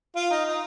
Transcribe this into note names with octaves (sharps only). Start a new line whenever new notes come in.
F4
D#4
D#4